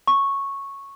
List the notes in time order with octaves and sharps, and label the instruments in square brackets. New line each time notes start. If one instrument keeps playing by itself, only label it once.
[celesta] C#6